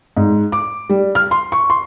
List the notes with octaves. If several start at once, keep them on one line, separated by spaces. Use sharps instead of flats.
G#2
D6
G3
F6
C6
C#6
C6